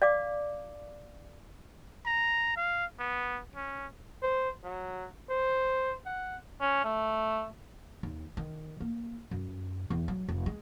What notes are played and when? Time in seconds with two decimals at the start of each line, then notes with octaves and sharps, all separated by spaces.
0.02 D5 F5 D6
2.06 A#5
2.56 F5
2.99 B3
3.55 C#4
4.22 C5
4.64 F#3
5.30 C5
6.06 F#5
6.61 C#4
6.84 A3
8.03 D#2
8.37 D#3
8.80 A#3
9.31 F#2
9.90 E2
10.08 F#3
10.28 F1
10.46 G#3